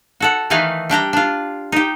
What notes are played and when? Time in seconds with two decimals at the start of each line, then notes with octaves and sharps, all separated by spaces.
0.20 F#4 A4 F#5
0.50 D#3 E3 A3 D#4 B4 F5
0.89 G3 D4 G4 A#5
1.13 D4 F4
1.72 D#4 G4